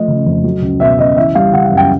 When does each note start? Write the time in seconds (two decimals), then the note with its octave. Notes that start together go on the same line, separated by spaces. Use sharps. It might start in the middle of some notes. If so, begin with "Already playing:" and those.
Already playing: F3 A3 D#5
0.08 C#3
0.26 F2
0.44 F#3
0.62 C#2
0.80 B2 E5
0.99 C#2 D#5
1.17 E3 E5
1.35 G3 F5
1.53 C#3 F#5
1.65 F#5
1.71 F#2
1.77 G5